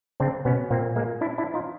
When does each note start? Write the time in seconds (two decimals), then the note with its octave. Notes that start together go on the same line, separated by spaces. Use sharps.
0.20 C#3 C4 D4
0.45 B2 B3 C#4
0.70 A#2 A#3 C4
0.95 G#3 A#3
1.21 D4 E4
1.38 D4 E4
1.54 D#4 F4